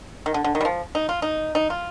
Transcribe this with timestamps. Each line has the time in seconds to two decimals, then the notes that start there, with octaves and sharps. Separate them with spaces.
0.26 D#3
0.34 D3
0.44 D3
0.55 D#3
0.61 G3
0.65 F3
0.95 D#4
1.09 F4
1.22 D#4
1.55 D#4
1.70 F4